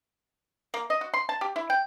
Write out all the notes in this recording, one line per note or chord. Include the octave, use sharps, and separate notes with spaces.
A#3
D#5
F#4
C6
A5
G4
E4
G5